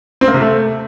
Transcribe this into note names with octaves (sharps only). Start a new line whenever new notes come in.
C4
A#3
C3
A3